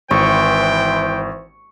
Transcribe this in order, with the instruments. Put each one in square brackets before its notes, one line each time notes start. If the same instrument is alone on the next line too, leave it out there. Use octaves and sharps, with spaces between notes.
[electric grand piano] G#1 [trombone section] E3 C5 [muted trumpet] G5 [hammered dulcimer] C#6